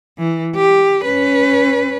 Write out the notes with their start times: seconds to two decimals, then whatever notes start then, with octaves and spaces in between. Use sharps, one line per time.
0.19 E3
0.56 G4
1.05 C#4 B4